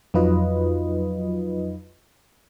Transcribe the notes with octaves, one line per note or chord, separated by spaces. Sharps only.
F2 F#3 D#4 F4 B4 D#5